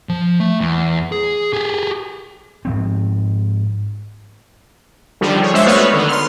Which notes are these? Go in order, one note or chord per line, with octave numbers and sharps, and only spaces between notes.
F3
A3
E2
G#4
G4 G#4
G#2 F3 C4
D3 D#3 F3 G3
G#4 C#5
G#3 D4 C5 E5 C7 C#7
A3 B3 F#4 B4 C#5 F5
D3 D#3 B3
C6 F6